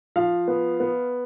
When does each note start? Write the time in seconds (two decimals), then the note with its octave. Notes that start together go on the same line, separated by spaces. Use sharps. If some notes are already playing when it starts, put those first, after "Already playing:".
0.16 F3 F5
0.48 B3
0.80 B3